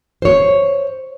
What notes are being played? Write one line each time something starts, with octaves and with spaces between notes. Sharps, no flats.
C5 C#5